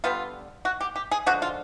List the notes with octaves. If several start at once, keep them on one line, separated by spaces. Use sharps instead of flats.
D3 G3 B3 F4
F#4
G4
G4
G#4
D3 F3 G#3 F#4
F4